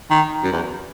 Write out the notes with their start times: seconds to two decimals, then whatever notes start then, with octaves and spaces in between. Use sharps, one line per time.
0.11 D#3
0.43 F#2
0.52 E2